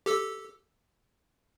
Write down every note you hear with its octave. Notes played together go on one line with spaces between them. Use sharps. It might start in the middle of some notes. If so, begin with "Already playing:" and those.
G4 A4 E6